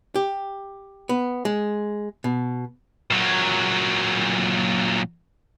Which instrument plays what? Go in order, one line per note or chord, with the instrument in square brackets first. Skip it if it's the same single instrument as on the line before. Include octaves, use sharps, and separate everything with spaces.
[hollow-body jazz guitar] G4
B3
G#3
B2
[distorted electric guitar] A#2 F#3